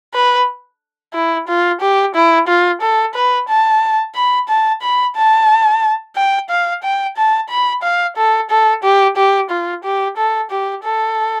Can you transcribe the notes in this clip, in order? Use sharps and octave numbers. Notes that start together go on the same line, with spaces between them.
B4
E4
F4
G4
E4
F4
A4
B4
A5
B5
A5
B5
A5
G5
F5
G5
A5
B5
F5
A4
A4
G4
G4
F4
G4
A4
G4
A4